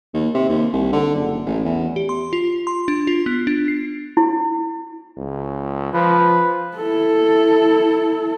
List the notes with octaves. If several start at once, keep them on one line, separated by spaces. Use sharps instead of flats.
D#2
C3
D#2
C2
D3
F#1
A1
E2
G4
C6
F4
C6
D4
F4
B3
D4
C7
E4
C#2
F3 B4
E4 A4